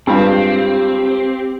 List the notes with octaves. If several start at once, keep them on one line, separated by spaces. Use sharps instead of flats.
G2 G#3 C4 F4 G4